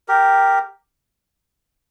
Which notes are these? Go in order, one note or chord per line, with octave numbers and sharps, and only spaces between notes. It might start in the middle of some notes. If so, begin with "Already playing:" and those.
G4 A#4